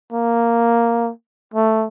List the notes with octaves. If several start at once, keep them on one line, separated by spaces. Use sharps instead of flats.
A#3
A3